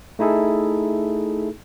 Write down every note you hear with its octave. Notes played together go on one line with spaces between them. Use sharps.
A3 D#4 E4 G#4 A4